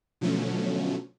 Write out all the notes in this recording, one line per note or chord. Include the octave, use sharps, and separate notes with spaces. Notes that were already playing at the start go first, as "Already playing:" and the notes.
B2 D3 F3 F#3 A3 C#4